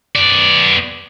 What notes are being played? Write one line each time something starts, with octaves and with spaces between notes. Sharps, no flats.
B3 D5